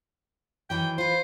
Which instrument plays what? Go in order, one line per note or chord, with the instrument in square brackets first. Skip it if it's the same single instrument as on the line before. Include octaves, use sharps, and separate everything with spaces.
[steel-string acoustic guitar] D#3 E3 F#3 [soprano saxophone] G5
[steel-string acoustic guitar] F4 B4 [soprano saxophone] C5